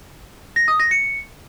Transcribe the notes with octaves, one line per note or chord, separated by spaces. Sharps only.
A#6
D#6
A#6
C#7